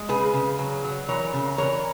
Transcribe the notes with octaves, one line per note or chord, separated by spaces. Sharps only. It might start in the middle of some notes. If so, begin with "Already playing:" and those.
Already playing: G#3
C#3 G#4 B4
C#3
F#3
F#3
E3 A#4 C#5
C#3
E3 A#4 C#5